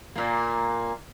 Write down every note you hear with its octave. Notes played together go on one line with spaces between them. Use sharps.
A#2 A#3